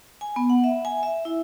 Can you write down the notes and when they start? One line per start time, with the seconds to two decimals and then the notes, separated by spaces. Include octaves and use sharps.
0.21 G#5
0.36 B3
0.50 F#5
0.64 E5
0.85 G#5
1.03 E5
1.25 E4